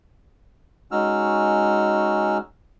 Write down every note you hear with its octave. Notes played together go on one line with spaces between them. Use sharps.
G#3 C#4 D#4 F#4 E6 F6